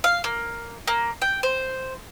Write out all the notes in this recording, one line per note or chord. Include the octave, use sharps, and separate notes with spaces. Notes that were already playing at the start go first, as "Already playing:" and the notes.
F5
A#3
A#3
G5
C5